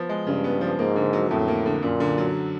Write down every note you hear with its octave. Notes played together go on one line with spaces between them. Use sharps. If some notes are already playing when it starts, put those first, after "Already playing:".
Already playing: F3 B3
G#3
G2 C#3
B3
F3
G#2 A#3
D3
F#3
F2 A2
A#3
D3
F#2 A#2
D3
F#3